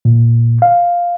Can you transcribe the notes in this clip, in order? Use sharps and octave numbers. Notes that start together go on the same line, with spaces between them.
A#2
F5